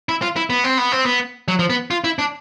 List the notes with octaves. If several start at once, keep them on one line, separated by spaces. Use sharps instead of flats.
E4
F4
E4
B3
C4
B3
C4
B3
F#3
F3
B3
F4
E4
D4